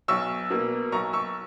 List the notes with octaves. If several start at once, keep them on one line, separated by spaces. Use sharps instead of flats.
B1 C#6 E6
B2 A#3
B1 A#5 C#6
C#6 E6